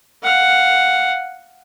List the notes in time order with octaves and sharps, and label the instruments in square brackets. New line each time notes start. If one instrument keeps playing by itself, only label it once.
[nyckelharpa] F5 F#5